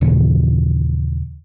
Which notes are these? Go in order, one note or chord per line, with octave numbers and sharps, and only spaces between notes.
D#2 A#2 C#3 E3